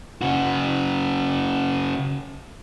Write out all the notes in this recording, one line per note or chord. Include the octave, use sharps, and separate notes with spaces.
C#3 F#4